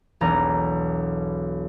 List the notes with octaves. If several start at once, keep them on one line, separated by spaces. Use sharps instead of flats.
E1 B1 A#5